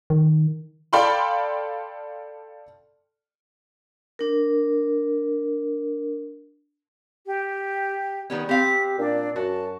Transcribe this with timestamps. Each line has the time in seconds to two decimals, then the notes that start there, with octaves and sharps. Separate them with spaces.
0.10 D#3
0.93 A4 D5 F5 G5 B5 C6
4.19 D4 A#4
7.26 G4
8.30 D#3 G3 B3 C#4
8.49 C4 G4 F5 B6
8.99 A#2 D4
9.36 F#2 F#4 A5